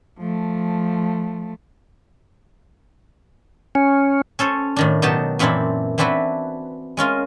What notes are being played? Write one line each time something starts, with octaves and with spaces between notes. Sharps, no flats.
F3 A3
C#4
C#4 A4 C5 C#5
A2 D#3 D4
B2 F#3 D#4 G4 A5
F#2 A#2 E3 C4 D4 E4
E3 C4 D4 E4 F#4 B4
G#3 C#4 F4 A#4